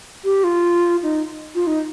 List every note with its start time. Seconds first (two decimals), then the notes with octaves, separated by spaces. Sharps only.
0.25 G4
0.44 F4
1.03 D#4
1.55 F4
1.67 D#4